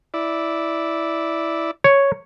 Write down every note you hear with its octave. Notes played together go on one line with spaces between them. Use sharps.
E4 D5
C#5